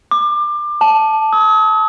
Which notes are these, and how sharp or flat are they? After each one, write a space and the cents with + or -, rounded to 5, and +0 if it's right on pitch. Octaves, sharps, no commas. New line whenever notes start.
D6 +25
A5 -5
D#6 +45